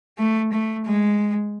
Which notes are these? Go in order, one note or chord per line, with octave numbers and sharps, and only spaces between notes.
A3
A3
G#3